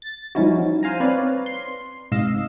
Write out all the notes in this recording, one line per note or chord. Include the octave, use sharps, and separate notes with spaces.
A6
F3 G3 C#4 D#4 E4 F#4
C5 F5 G#5 A#5
C4 B4 C#5 D5 F5
C6
G#2 C3 D#5 F5 E6